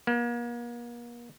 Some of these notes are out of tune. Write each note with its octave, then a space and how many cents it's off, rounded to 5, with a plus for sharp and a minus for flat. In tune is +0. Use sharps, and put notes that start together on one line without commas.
A#3 +40